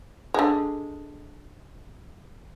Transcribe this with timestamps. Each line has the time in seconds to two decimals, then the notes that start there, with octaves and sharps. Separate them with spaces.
0.34 D3 G#3